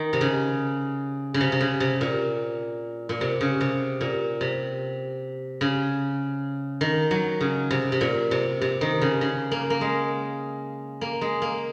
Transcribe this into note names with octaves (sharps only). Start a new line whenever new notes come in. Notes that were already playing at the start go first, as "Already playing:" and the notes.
Already playing: D#3
C3
C#3
C#3
C3
C3
C#3
C3
A#2
A#2
C3
C#3
C3
A#2
C3
C#3
D#3
F#3
C#3
C3
C3
A#2
C3
C3
D#3
C#3
C#3
A#3
A#3
G#3
A#3
G#3
A#3